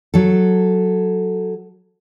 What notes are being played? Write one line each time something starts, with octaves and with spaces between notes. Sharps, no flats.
F#3 A4